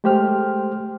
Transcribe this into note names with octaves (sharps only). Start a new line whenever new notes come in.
G#3 A3 G4 C5 G5 F6